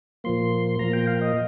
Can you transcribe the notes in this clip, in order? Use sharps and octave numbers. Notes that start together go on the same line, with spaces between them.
A#2 F3 A#3 C6
A#2 F3 A#3 A#5
G5
F5
D#5